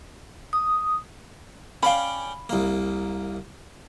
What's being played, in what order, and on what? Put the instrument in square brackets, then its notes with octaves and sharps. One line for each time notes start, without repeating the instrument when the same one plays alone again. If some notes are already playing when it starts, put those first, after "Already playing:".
[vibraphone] D#6
[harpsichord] C#4 D5 G5 [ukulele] F5 B5
[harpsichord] C2 A#3